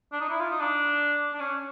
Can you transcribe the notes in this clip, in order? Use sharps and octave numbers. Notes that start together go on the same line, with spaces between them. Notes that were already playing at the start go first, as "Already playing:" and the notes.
D4
D#4
E4
F4
D#4
D4
D4
C#4